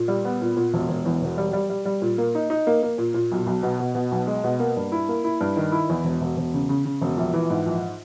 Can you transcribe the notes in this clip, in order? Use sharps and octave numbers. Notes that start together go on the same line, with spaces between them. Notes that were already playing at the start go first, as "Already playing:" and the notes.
Already playing: A#2
G3
B3
A#2
A#2
E1
E1
E2
E1
G3
G3
G3
G3
A#2
A#3
D#4
D#4
A#3
A#3
A#2
A#2
B1
B1
B2
B2
B2
B1
G#3
B2
A#3
G2
E4
A#3
E4
G2
D#3
E4
E2
E1
E1
E1
C#3
C#3
C#3
E1
A#1
E3
G#2
A#1